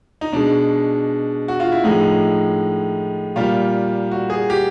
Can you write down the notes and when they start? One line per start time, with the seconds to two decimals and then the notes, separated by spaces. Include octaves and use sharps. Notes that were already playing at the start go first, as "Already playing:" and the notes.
0.21 D#4
0.32 B2 G#3 D4
1.48 F#4
1.60 F4
1.72 E4
1.84 A2 F3 G#3 D#4
3.36 A#2 G3 F4
4.11 F#4
4.30 G#4
4.50 G4